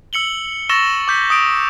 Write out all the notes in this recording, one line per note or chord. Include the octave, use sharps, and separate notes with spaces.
E6 C#7 F#7 G7
C#6 E6 A6 A#6 E7 G7
D6 G6 B6
D#6 D7